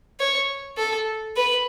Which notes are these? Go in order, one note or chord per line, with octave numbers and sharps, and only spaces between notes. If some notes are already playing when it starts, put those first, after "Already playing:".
C#5
A4
B4